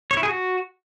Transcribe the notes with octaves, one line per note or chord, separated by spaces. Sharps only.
C#5
E4
G#4
F#4